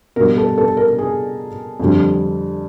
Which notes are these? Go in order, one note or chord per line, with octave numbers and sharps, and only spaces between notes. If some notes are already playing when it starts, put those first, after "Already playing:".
B2 G3 A#4
A4
A4
A#4
G#4
F2 D3 G3